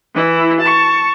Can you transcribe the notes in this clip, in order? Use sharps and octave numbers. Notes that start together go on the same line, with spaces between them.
E3 E4
A5 C#6